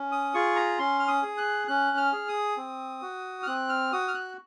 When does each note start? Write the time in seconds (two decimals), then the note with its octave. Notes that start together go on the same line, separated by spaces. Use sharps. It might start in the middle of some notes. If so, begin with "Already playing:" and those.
Already playing: C#4
0.12 D#6
0.34 F4 G#4 C#6
0.56 A#5
0.79 C#4 C6
0.99 F6
1.08 D#6
1.23 G#4
1.38 F#6
1.68 C#4 F#6
1.97 F6
2.13 G#4
2.28 D#6
2.57 C4
3.02 F#4
3.43 F6
3.47 C4 F#6
3.69 F6
3.92 F#4 D#6
4.08 F6
4.14 F#6